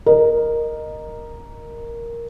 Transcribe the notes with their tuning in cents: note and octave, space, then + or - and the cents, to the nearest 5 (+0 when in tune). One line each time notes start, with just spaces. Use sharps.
A#4 +0 D#5 -15